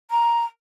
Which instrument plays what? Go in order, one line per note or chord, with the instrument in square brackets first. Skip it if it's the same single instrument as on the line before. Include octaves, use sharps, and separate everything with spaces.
[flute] A#5